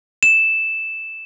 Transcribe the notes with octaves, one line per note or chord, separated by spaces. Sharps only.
E7